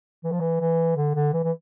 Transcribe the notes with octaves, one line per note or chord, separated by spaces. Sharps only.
E3
F3
E3
E3
D3
D3
E3
E3